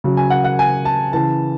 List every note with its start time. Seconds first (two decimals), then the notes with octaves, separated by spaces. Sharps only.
0.04 C#3 F#3
0.17 G#5
0.30 F#5
0.44 F#5
0.59 G#5
0.85 A5
1.13 C#3 E3 A5